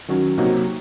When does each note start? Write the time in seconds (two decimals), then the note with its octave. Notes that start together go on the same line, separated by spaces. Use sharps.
0.08 D#3 F#3 C#4 F#4
0.38 C3 F#3 A#3 D#4 F#4